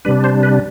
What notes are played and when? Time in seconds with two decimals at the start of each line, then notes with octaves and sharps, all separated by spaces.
0.05 C3 G3 D4 B4
0.24 C5
0.43 B4